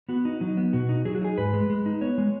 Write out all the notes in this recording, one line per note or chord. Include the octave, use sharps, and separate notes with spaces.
B3 F#4
D#4
F#3 D#4
B3
B2 F#4
D#4
F#3 G#4
F#4
D#4 G#4
G#2 B4
G#3
G#3
D#4
B3 C#5
G#3